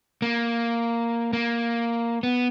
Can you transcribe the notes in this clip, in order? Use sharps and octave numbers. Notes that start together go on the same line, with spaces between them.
A#3
A#3
B3